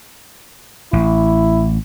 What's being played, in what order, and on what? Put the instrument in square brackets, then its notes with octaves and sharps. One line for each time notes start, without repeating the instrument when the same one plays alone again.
[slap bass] A1 [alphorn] E4